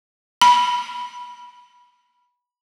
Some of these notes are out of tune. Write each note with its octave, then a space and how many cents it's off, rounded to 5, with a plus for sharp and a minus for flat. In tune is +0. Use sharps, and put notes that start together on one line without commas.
B5 -15